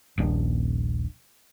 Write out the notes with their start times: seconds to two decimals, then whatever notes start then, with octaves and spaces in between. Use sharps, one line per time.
0.18 D#1 A#1 D4